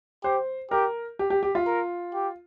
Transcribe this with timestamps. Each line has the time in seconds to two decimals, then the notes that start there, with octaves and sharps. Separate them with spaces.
0.24 G4 C5
0.71 G4 A#4
1.19 G4
1.30 G4
1.43 G4
1.55 F4
1.66 A#4
2.14 G4